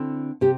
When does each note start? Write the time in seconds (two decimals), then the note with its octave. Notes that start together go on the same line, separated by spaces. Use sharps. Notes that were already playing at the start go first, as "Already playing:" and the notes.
Already playing: D3 C4 E4
0.41 C3 G4